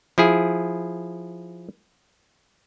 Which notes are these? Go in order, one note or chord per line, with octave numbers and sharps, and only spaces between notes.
F3 E4 G#4